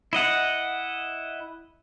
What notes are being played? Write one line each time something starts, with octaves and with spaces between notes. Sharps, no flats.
E4 D#5 F#5